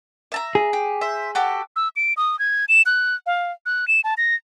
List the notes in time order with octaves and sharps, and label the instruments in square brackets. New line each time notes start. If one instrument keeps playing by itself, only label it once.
[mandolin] E5 A5 A#5
[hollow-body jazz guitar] G#4
[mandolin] G4
C5 E5
F#4 G4 A4
[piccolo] E6
D7
D#6
G#6
E7
F#6
F5
F#6
E7
A5
A#6